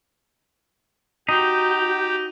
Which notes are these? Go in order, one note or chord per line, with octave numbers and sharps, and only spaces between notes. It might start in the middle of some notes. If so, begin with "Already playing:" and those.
D#4 F#4 G4